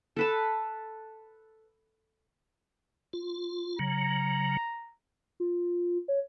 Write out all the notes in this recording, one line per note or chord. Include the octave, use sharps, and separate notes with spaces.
A4 B4 A5
F4
C#3 F#3 A#5
F4
C#5